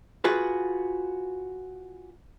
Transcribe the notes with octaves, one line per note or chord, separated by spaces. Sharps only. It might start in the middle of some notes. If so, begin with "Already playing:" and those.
F4 F#4 G#4 B4